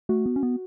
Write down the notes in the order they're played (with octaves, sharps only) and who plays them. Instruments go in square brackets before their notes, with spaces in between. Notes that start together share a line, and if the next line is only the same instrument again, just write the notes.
[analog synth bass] A3 [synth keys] F#4
[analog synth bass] B3
C#4
B3